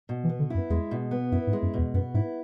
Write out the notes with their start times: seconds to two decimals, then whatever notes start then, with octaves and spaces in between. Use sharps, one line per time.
0.09 B2
0.24 E3
0.29 B3
0.39 D3
0.50 F#2 E4
0.70 E2 G#3
0.91 B2
1.11 B3
1.32 F#2 E4
1.47 G#2
1.53 G#3
1.62 F#2
1.74 E2 B2
1.94 F#2 B3
2.14 G#2 E4